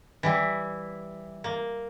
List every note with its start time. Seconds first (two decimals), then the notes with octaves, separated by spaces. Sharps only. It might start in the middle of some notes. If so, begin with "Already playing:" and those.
0.23 E3 G3 E4
1.44 A#3